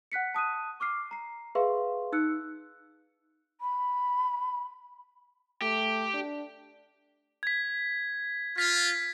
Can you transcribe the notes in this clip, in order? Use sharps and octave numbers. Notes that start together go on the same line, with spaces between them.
F#5 F#6 B6 C#7
A5 D#6 F#6 D#7
C#6 D6 F6 C7
A#5 C7
G#4 B4 E5 F5 C6 C#6
D#4 E6 F#6 C#7
B5
A3 G4
D4
G#6 B6
F4 B6